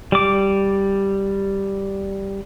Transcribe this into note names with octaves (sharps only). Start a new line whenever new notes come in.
G3 D6